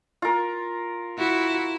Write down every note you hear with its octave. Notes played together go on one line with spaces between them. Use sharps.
F4 A#4
E4 F#4